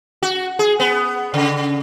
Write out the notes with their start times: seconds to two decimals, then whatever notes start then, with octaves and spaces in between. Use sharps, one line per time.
0.23 F#4
0.59 G#4
0.80 B3
1.34 C#3